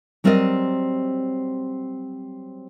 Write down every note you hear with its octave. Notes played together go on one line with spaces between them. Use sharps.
F#3 G3 C4 A#4 D5 D#5